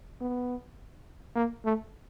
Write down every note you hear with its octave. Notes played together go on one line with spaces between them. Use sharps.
B3
A#3
A3